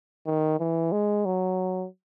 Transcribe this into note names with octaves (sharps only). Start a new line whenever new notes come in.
D#3
E3
G#3
F#3